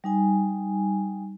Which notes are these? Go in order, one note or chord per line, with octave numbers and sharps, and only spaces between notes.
G3 D#4 G#5